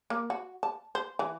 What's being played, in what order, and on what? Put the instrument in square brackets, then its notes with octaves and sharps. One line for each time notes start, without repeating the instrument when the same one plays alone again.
[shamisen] A#3
F#4
A5
C5
E3